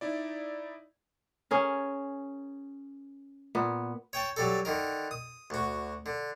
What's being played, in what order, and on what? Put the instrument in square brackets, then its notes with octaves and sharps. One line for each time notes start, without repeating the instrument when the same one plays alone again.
[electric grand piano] D#4 E4 D5
[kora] C#4 G#4 A#4
A#2 B3
[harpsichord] C#5 G5 A5
F#3 G3 A4
D3 D#3 A#4
D#6
D2 F#4
D3